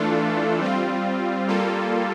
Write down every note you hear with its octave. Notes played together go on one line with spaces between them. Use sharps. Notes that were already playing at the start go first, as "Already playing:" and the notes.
Already playing: E3 A3 D4 F4 A4
G3 C4 F4
G3 A#3 F4 A4